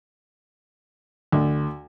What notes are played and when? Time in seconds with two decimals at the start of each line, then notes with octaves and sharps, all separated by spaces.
1.32 D2